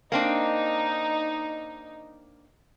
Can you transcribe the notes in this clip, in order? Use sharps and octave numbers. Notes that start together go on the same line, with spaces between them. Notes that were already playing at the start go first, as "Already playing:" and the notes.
A#3 C4 D4 D#4